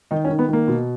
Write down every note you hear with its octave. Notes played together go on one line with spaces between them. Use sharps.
D#3 D#4
C#4
D#3
B3
D#3 A#3
B2